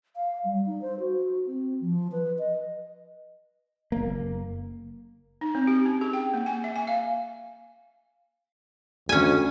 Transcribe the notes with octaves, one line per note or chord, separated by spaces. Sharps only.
F5
G3
D#4
C5
F#4
C4
F3
B4
D#5
F#1 A#3
D#4
C4
G4
C#4
G#4
G5
A#3
G#5
E5
G#5
F5
D2 C#4 G#5